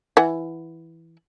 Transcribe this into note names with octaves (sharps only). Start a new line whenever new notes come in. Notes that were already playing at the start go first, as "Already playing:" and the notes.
E3 F#5